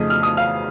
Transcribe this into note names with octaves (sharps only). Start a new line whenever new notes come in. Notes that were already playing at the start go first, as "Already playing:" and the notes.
Already playing: F2 C#3 A3 D#4 D#6
F6
D#6
F5 F6